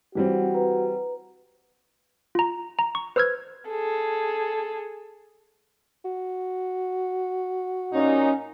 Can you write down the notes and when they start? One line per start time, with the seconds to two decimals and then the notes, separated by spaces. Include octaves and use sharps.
0.15 E3 G3 C4 F4 F#4 C#5
0.54 B4 A#5
2.35 F4 A#5
2.79 A#5
2.95 C#6
3.16 B4 C5 E6 F6 G#6
3.69 G#4 A4
6.05 F#4
7.93 A#2 C#4 D#4